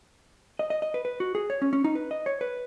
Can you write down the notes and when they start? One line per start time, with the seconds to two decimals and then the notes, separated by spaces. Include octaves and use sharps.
0.59 D#5
0.70 D#5
0.82 D#5
0.94 B4
1.05 B4
1.20 F#4
1.35 G#4
1.50 C#5
1.62 C#4
1.73 C#4
1.84 D#4
1.95 B4
2.11 D#5
2.26 C#5
2.41 B4